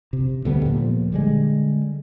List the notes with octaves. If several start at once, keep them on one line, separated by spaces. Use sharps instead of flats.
C3
D2 D3 G3 B3
A#2 F3
D3 G3 G#3